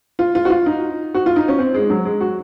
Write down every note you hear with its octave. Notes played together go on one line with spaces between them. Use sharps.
F4
F4
F#4
F4
D#4
F#4
F4
D#4
C#4
C4
G#3
F#3
G#3
F#4